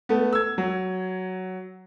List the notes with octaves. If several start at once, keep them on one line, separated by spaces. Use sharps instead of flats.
A3 B3
E6 G#6
F#3